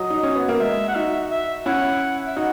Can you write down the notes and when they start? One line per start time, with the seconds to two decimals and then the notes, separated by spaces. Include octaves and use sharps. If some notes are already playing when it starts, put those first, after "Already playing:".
Already playing: F#3 D#5
0.10 D#4
0.23 C#4
0.36 B3
0.48 A#3
0.60 G#3 E5
0.89 F#5
0.95 D#4 F#4 E5
1.31 E5
1.66 C#4 E4 F#5
2.27 E5
2.36 D#4 F#4 F#5